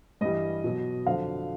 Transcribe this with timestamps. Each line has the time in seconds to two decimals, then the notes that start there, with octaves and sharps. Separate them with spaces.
0.21 G2 E3 G3 D#5
0.64 B2 F#3
1.06 F2 D3 F#3 F5